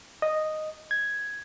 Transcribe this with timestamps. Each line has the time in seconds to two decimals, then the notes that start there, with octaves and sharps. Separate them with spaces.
0.22 D#5
0.91 G#6